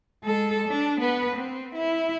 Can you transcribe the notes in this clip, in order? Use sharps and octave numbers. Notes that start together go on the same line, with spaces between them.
G#3 A4
D4
B3 B4
C4
E4